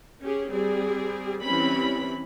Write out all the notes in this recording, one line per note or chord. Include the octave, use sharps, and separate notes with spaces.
C#4 G4 G#4
G3 C4 G#4
E3 G3 C4 C#4 B5